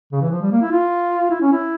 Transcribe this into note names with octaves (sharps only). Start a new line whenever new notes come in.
C#3
E3
F3
G3
A#3
E4
F4
E4
C#4
E4